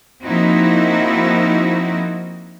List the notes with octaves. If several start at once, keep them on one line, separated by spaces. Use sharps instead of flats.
F3 A#3 C4 D#4 E4 F#4